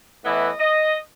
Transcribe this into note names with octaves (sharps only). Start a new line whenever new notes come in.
A2 E3 B3 E4 D#5
D#5